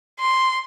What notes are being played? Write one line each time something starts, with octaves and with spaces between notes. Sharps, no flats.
C6